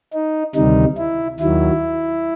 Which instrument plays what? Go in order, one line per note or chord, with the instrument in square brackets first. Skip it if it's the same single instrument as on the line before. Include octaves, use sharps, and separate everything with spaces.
[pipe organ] D#4
D2 C3 D#3 G3 D#4
E4
D#2 D#3 F#3 E4